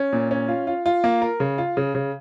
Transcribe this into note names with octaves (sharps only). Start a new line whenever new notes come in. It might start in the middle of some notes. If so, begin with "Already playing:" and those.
Already playing: C#4
A#2
C#4
F4
F4
F4
A#3
A#4
C#3
F4
C#3
C#3